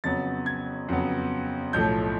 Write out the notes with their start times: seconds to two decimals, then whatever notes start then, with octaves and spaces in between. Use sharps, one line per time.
0.04 F2 C#3 F#3 B3 A6
0.46 G#6
0.88 F2 C#3 F#3 B3
1.73 B1 A2 F3 A3 G6